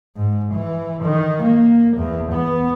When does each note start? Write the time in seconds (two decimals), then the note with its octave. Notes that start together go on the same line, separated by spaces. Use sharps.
0.17 G#2
0.54 E3
1.03 D#3
1.43 A#3
1.97 E2
2.32 B3